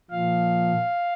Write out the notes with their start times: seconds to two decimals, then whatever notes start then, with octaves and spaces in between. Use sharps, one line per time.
0.11 A#2 F3 F5